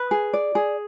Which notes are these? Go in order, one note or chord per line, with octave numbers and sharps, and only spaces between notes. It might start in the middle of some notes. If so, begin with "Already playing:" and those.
Already playing: B4
G#4
D5
G#4